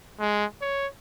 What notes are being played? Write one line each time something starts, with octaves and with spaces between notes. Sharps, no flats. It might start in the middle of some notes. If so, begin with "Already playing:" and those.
G#3
C#5